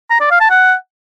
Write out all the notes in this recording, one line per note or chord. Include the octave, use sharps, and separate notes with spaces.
A#5
D5
F5
A5
F#5